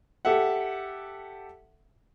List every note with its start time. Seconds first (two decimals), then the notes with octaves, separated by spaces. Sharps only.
0.25 G4 A4 E5 F#5